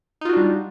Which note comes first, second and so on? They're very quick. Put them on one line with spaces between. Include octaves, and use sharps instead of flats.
D#4 F4 F#4 D4 G3